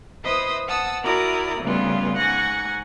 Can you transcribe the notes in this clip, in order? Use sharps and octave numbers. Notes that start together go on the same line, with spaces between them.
E4 B4 C5 D#5 D#6 E6
F#5 A5 D#6 E6
E4 F#4 A#4 D5 D#6
F2 C#3 G3 A3 B3 F4
G#2 F#5 G#5 C#6 A#6